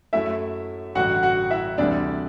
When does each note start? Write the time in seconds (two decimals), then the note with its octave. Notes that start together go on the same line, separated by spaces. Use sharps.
0.13 F#2 F#3 A3 E4 E5
0.95 A1 G2 D3 F#4 F#5
1.23 F#4 F#5
1.51 E4 E5
1.78 D2 C3 E3 G3 D4 D5